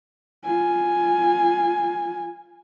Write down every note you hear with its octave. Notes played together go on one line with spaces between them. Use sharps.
F4 G#5